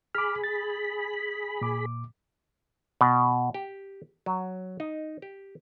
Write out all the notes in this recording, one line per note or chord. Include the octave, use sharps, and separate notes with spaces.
G#4 B5 D6 F6
A6
A#2 D6
B2
G4
F#3
D#4
G4